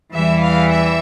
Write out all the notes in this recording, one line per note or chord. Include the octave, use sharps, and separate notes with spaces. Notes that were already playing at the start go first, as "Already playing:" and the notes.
E2 E3 G3 E5
F5
E5